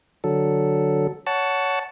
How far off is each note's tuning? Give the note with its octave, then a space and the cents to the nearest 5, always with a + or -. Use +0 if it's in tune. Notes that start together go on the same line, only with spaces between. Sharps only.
D3 +0 F#3 +0 A4 +0
C#5 +20 F#5 +0 A5 +0